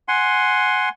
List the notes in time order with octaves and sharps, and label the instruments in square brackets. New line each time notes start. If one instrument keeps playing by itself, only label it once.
[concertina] F#5 G#5 C6